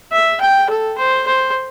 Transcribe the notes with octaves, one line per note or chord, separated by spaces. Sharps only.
E5
G5
A4
C5
C5